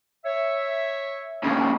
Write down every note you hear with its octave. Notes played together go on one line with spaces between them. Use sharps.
C#5 E5
D#2 C#3